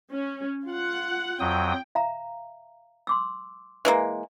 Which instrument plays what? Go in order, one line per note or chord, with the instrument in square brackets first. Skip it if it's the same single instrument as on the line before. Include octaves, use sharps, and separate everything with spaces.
[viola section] C#4
F4 F#5
[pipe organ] F2 F#3 D#6 [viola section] G5
[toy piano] E5 F5 A#5
C6 D6 E6
[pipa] E3 G#3 A#3